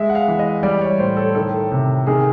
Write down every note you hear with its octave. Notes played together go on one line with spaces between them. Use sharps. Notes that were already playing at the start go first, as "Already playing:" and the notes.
Already playing: G#3 E5
F#5
F5
E3
D#5
G3 D5
C#5
A2 C5
A4
D#3 A4
C3
D#3 G#4